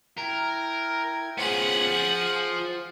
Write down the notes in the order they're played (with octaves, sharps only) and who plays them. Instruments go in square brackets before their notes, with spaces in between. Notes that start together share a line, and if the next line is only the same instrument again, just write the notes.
[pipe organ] E4 G5 G#6 [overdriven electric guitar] A#4
[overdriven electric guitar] B3 C#4 [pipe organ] F4 C5 [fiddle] G#4 F#5
[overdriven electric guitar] F3